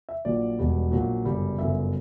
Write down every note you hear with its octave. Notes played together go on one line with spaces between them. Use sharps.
E5
A#1 A#2 F#3 D5
E1 E2 B2 G3
A#1 A#2 F#3
G1 F#2 C#3 G3
G1 F#2 C#3 E5